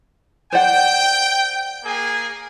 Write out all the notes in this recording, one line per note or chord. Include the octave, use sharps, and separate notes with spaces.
C5 D5 F#5 G5
A#3 G#4 G#5